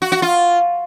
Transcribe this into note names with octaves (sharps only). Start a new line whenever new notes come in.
F#4
F#4
F4